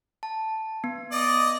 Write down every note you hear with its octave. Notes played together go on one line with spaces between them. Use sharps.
A5
B3
D5 D#5